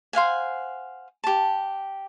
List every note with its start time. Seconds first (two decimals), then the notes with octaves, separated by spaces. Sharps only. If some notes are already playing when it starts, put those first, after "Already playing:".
0.13 C5 F5 F#5 G#5
1.24 G4 A5